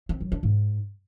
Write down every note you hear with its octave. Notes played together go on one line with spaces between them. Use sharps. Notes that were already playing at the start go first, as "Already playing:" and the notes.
C4
F#3
D4
G#2